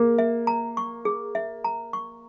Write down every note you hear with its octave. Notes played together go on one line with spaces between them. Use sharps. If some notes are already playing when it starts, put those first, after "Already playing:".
Already playing: A#3 G#4
E5
A#5
C#6
G#4
E5
A#5
C#6